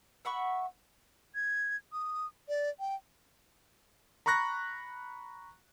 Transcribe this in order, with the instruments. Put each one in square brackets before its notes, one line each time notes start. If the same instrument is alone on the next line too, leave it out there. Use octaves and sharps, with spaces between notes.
[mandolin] E5 F#5 B5 C#6
[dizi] G#6
D#6
D5
G5
[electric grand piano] A#5 B5 C#6 F#6 A#6